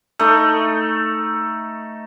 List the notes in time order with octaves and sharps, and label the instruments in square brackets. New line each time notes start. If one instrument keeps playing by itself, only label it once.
[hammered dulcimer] A3 D#4